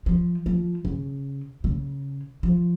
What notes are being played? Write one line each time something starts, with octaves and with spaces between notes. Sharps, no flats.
F3
F3
C#3
C#3
F3